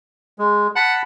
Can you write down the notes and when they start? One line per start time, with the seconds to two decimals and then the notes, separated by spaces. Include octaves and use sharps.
0.39 G#3
0.76 F#5 A5 B5